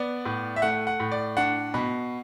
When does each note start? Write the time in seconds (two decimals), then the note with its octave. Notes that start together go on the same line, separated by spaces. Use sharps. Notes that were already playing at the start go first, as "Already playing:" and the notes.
Already playing: B3 D5
0.25 A2
0.56 E5
0.62 A3 F#5
0.87 F#5
1.00 A2
1.12 D5
1.37 D4 F#5
1.74 B2 B5